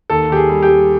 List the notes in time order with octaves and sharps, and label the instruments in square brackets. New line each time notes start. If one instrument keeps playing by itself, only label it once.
[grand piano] D#2 A4
D#2 G4
G#4
G3
G4
G3